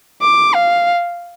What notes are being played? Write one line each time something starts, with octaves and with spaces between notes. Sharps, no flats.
D6
F5